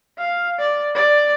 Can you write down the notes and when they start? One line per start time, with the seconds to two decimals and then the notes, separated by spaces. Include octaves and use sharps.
0.18 F5
0.59 D5
0.95 D5